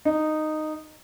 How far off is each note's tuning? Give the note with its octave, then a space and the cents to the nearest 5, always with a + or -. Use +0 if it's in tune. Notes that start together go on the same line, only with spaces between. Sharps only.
D#4 -10